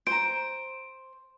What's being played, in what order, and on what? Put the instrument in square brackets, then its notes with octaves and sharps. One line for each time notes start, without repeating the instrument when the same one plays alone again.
[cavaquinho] C5 A#5 [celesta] D7